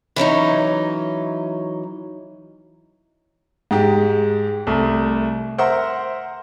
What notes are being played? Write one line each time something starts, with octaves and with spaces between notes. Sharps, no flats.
E3 F#3 C#4 D#4
G#2 G#3 G4
C2 A3
A#4 C5 E5 F#5 C6